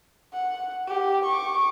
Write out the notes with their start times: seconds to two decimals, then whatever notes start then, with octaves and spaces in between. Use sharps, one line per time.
0.33 F#5
0.87 G4
1.25 C#6 D6